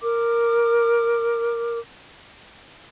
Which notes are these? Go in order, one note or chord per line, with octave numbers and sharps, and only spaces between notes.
A#4 D6